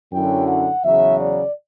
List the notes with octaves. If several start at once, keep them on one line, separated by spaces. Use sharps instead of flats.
F#2 D3 F#3 C#4 E4 G5
F#5
E2 C#3 F#3 E5
D5